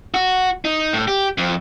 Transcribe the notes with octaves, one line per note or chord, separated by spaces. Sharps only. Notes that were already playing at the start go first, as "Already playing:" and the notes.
F#4
D#4
A2
G4
F2